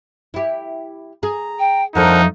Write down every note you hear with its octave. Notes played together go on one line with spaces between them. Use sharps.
E4 G4
G#4 A#5
G5
F2 F3 A3 D4 D#4 A#4 C5 F#5